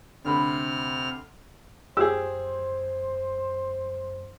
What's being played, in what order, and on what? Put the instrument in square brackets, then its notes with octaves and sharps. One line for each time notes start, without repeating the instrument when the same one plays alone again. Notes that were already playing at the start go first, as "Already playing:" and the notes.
[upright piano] D2 B5 [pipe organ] C3 F6
[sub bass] F#2 [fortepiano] G4 G#4 [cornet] C5 [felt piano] E6